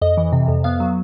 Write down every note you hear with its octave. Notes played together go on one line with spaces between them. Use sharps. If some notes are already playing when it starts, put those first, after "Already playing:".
F2 D#5
E3
C3
F2
B3 F5
F#3